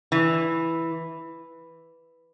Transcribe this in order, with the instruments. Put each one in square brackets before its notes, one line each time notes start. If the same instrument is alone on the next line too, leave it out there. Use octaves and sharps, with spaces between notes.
[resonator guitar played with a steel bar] E3